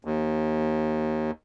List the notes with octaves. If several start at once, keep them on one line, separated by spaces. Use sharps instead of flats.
D#2